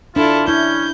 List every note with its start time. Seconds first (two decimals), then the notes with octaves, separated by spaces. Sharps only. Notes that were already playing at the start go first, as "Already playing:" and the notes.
0.16 D4 E4 F4 A4
0.48 C#4 E4 G6